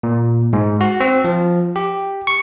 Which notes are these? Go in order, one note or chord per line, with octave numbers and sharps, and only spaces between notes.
A#2
G#2
F#4
C4
F3
G4
C#6